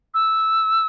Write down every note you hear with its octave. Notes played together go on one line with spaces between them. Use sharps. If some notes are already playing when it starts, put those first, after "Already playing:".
E6